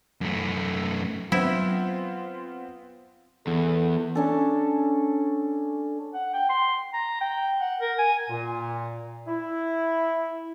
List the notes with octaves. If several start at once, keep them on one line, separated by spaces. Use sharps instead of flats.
F#2 A3
F#3 B3 C4 E4 F4
E2 A4
C#4 D4 A4
F#5
G5
C6
A#5
G5
F#5
A#4
G#5
A#2
E4